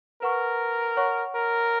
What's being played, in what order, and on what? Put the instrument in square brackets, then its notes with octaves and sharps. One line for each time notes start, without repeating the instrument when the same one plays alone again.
[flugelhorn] A#4 [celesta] B4 F#5 C#6
[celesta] C#5 F#5 C#6
[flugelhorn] A#4